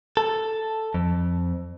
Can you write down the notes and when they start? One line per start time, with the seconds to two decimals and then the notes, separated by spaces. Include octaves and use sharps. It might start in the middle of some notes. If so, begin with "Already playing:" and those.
0.17 A4
0.94 F2